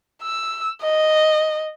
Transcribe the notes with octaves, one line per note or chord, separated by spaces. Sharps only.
E6
D#5